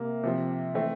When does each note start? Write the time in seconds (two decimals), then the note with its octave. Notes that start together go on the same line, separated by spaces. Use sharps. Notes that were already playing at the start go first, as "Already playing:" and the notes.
Already playing: C3 A#3
0.23 C3 F3 C4
0.74 E3 A3 C4